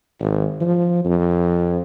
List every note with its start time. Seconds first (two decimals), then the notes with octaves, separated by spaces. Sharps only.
0.20 G#1
0.61 F3
1.05 F2